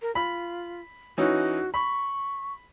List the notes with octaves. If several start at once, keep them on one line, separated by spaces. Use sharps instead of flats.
A#4
F4 B5
E3 C#4 D#4 F#4
B5 C#6